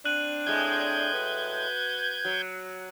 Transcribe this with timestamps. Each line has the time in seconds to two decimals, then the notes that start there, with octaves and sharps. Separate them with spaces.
0.05 C4 D4 F#6 D#7 F#7
0.47 A2 G#3 G6 G#6
1.14 F#4 B4
2.25 F#3